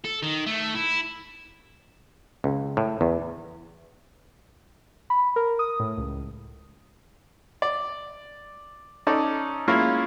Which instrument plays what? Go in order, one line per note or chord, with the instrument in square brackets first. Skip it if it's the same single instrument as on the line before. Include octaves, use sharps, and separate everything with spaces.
[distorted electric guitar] A4
D#3
A3
E4
[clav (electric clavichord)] C#2
A2
E2
[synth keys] B5
A#4
D#6
A2
C#2
[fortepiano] D5
C#4 D#4 A4 D5
G#3 A#3 C#4 E4 F4